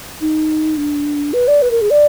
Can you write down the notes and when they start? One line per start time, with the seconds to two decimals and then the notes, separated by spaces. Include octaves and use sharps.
0.21 D#4
0.77 D4
1.33 B4
1.48 D5
1.62 B4
1.71 A#4
1.81 G#4
1.91 D5